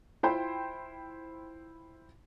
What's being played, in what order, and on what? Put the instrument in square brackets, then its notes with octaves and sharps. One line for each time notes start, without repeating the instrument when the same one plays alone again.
[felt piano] E4 F4 C5 G5 B5 C6